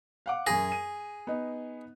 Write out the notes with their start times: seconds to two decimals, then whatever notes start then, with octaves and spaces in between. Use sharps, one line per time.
0.26 F5 F#5 D6
0.47 F#2 G#4 G#5 A#6
0.72 D#7
1.27 B3 D#4